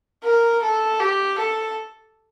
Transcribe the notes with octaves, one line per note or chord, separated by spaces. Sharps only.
A#4
A4
G4
A4